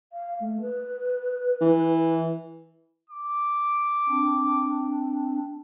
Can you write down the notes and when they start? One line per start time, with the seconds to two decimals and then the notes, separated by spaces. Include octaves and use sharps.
0.13 F5
0.40 A3
0.61 B4
1.61 E3
3.10 D6
4.09 C4 D4